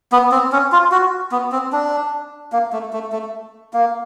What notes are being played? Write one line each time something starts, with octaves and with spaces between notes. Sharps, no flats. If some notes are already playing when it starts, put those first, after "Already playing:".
B3
C4
C#4
F4
F#4
B3
C4
D4
A#3
A3
A3
A3
A#3